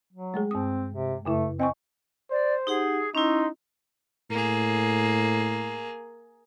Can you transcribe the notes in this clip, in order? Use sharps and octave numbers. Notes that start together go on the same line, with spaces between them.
F#3
G#3 A3 G#4
G2 C4 D#6
C3
F#2 C#3 A3 E4
C4 D#5 G#5 C#6
C5 D5
D#4 G4 G#4 F#5
C#4 D#4 E4 C6
A2 A#3 G#4